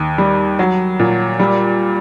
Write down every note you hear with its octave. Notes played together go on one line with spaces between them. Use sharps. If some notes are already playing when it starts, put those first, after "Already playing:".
Already playing: D#2
G3
F#3
A#2
G3